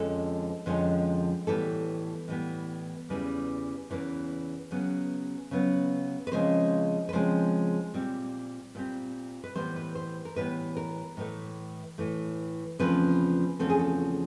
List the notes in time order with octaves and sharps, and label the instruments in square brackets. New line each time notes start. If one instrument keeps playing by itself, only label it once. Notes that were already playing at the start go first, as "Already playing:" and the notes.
Already playing: [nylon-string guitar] F2 D3 F3 G#3 C#4 A4
F2 D3 F3 G#3 C#4
A2 E3 G3 B3 A4
A2 E3 G3 B3
E2 C#3 E3 G3 A#3
E2 C#3 E3 G3 A#3
C#3 F#3 B3
C#3 F#3 B3
B4
C#3 F3 G#3 C4 C5
B4
C#3 F3 G#3 C4 C5
A#2 G3 C4
A#2 G3 C4
B4
A2 E3 G3 B3 C5
B4
C5
A#4
A2 E3 G3 B3 B4
A#4
A2 E3 A3
A2 E3 A3
E2 C#3 F3 A3 C4 B4
E2 C#3 F3 A3 C4 A4
G#4
A4